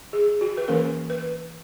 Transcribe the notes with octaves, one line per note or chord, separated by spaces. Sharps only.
G#4
F#4
B4
E3 A#3 C#4 A#4
B4